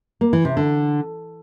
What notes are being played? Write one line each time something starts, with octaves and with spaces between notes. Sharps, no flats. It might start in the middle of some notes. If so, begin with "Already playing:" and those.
A#3
E3
C3
D3